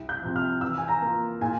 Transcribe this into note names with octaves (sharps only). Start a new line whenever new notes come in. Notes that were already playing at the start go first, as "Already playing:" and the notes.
Already playing: C2
G6
C3 F3
F6
E3 E6
G#5
A#5
A#3 F4
A#2 G#5